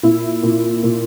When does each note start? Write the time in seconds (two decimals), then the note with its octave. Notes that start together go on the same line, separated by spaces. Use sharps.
0.03 A#2 E4
0.43 A#2
0.83 A#2